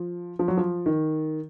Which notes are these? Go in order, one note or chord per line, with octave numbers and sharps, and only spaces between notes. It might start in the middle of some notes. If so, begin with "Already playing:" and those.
Already playing: F3
F3
F#3
F3
D#3